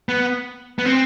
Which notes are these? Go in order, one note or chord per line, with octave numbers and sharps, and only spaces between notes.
B3
B3
C4